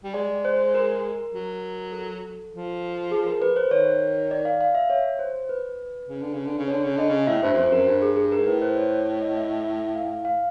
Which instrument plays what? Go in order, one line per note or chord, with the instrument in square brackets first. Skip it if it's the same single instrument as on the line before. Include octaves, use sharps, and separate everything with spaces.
[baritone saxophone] G3
[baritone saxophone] G#3 [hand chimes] D5
[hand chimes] C5
A#4
[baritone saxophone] F#3
[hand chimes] A4
[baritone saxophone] F3
[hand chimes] G#4
A#4
B4
C5
[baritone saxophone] D#3 [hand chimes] C#5
[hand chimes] D5
F5
F5
E5
C#5
C5
B4
[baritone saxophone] C#3
D3
C#3
D3
C#3
[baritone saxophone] D3 [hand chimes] C#5
[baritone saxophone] C#3
[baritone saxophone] D3 [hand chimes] D#5
[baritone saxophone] C#3
[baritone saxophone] A2 [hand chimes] E5
[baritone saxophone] G2 [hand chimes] C5
[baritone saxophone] F#2
[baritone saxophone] F2 [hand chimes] C5
[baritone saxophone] F#2 [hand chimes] A#4
[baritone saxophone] G2
[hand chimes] G#4
G#4
A#4
[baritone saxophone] G#2
[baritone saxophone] A2 [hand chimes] B4
[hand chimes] C5
C#5
C#5
C#5
D#5
E5
E5
F5
F5